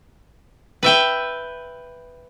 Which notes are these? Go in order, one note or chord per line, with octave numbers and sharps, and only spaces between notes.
B4 E5 G5